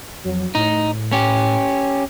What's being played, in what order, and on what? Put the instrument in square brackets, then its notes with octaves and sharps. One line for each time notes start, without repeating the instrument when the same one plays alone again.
[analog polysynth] F2 F#3
[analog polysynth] A2 [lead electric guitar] D#4
[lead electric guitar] C#4 G4